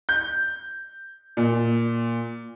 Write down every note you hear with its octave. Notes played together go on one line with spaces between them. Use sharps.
G6
A#2